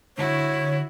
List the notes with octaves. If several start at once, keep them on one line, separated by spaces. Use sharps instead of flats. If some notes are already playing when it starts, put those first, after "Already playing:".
D3 E4 F#4 C#5